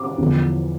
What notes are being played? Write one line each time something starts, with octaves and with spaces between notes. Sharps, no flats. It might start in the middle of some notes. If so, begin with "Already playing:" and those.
Already playing: D6
E2 D3 F3